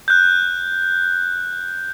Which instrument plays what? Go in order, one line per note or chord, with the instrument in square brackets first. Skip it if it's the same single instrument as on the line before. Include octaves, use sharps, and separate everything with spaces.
[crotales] F#6 G6